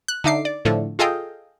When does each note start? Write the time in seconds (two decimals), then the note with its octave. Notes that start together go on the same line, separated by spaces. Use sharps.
0.08 F#6
0.24 D3 D#4 E5 D6 C7
0.45 D5
0.65 A2 D3 F3 A3
0.99 F4 G#4 A4 D#5 F5 G5